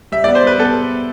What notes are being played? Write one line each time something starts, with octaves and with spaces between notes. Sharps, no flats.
G3 E5
B3 D5
C5
G3 B4
B3 A4